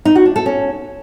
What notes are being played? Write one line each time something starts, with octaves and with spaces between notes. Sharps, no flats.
D#4
F#4
D4
A4
C#4